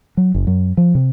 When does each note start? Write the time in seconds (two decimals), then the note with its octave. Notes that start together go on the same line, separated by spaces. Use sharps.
0.17 F#3
0.35 F#1
0.47 F#2
0.77 F3
0.95 C3